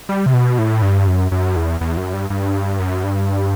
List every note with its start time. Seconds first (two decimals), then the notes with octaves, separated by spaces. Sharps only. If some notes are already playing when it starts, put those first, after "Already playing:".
0.09 G3
0.26 C3
0.33 B2
0.58 A2
0.82 G2
1.07 F#2
1.32 F#2
1.56 E2
1.81 E2
1.97 F#2
2.14 G2
2.30 G2
2.79 F#2
3.03 G2